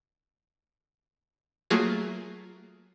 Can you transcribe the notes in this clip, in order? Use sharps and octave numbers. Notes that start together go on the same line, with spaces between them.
F#3 A3 A#3 F4 G#4